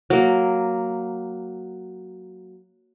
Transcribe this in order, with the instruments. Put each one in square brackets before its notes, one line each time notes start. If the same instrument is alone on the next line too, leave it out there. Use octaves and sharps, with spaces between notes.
[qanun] F#3 A#3